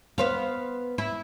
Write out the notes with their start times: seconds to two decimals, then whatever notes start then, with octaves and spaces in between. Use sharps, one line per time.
0.18 B3 C5 F5
0.98 E4